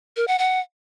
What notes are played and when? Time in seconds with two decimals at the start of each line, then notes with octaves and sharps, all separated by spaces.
0.17 A#4
0.28 F#5
0.39 F#5